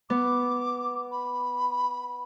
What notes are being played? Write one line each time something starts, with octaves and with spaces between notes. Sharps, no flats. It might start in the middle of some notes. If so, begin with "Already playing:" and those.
B3 D6
B5